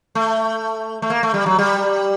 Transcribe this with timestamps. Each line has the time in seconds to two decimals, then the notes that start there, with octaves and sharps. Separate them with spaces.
0.15 A3
1.02 A3
1.10 A#3
1.23 A3
1.34 G3
1.46 F#3
1.59 G3